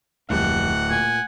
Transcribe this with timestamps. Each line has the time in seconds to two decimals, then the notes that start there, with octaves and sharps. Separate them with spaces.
0.30 D1 F2 G3 A#3 F#5
0.91 A#2 G#5